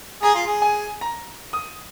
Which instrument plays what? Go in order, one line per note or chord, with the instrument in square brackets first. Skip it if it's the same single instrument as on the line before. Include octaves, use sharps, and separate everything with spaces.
[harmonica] G#4 [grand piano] A#5
[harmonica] F4
G#4
[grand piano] G#5
A#5
D#6